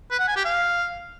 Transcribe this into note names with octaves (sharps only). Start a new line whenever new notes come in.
B4
F#5
G#5
G4
F5